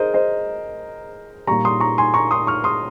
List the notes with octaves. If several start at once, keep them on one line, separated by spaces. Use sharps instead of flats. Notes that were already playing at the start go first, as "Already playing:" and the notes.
Already playing: G#4 A#4 C5 D#5
C5 D#5
A#2 G3 A#5 C#6
C6 D#6
A#5 C#6
G#5 C6
A#5 C#6
C6 D#6
C#6 F6
C6 D#6